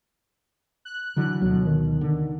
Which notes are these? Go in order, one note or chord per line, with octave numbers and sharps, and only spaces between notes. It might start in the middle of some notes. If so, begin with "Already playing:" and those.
F#6
D3 E3 F#3
D2 B2 F#3
D#3
D3